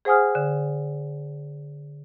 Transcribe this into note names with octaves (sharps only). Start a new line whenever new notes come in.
G#4 C5 F#5 G#5 D#6 F6
D3